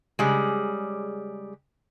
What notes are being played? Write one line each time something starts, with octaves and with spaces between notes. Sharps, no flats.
C#3 G3 G#3